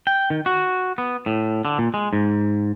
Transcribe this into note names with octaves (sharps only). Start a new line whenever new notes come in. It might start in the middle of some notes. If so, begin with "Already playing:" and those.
G5
D#3
F#4
B3
A2
D3
A#2
G#3
G#2